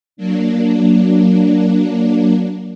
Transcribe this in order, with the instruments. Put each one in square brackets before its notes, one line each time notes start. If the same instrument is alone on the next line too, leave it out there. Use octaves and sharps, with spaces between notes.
[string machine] F#3 A#3 D4